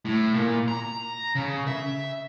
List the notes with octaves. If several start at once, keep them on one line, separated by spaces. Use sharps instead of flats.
A2
A#2
A#5
C#3
E5